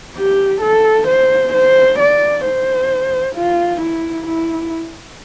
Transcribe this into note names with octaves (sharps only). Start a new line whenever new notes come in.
G4
A4
C5
C5
D5
C5
F4
E4
E4